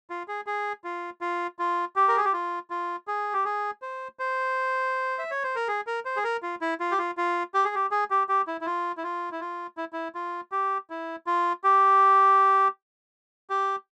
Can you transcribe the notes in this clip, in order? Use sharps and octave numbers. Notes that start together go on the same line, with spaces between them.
F4
G#4
G#4
F4
F4
F4
G4
A#4
G#4
G4
F4
F4
G#4
G4
G#4
C5
C5
E5
C#5
C5
A#4
G#4
A#4
C5
G#4
A#4
F4
E4
F4
G4
F4
F4
G4
G#4
G4
G#4
G4
G4
E4
E4
F4
E4
F4
E4
F4
E4
E4
F4
G4
E4
F4
G4
G4